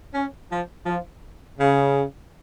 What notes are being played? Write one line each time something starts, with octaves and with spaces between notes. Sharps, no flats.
C#4
F3
F3
C#3